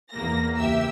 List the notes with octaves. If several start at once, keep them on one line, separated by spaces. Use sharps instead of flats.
E2 A#3 A#6
C#2 G4 E5 E6